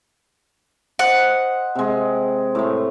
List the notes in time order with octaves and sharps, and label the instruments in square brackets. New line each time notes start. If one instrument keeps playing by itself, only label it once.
[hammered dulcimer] C5 D#5 [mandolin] F#5
[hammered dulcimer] C3 G#3
A2 A3